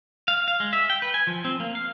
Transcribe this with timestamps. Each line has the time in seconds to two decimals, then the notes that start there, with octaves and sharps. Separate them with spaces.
0.28 F5
0.48 F5
0.60 G#3
0.73 E5
0.90 G5
1.02 B4
1.14 G#5
1.27 F3
1.45 C4
1.60 A#3
1.75 F5